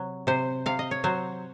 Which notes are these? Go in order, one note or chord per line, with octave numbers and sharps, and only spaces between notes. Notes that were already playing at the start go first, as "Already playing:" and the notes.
Already playing: C3 F#3
C3 C5
C3 F5
D#5
C#5
F#3 C5